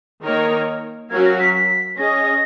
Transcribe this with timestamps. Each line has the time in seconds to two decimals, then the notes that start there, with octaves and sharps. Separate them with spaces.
0.23 D#3 A#3 D#4 A#4 C#5
1.10 F#3 C#4 F#4 A#4 F5 G#6
1.25 A#6
1.39 B6
1.54 B6
1.97 C#4 G#4 D#5 A#6